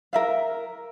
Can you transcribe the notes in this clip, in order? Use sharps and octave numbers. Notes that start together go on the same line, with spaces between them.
A#4 E5 F5